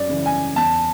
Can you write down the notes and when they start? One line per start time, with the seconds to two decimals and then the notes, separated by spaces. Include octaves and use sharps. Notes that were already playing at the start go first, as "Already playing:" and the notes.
Already playing: F#2 D5
0.09 C#3 E3
0.26 G#5
0.56 E2 A5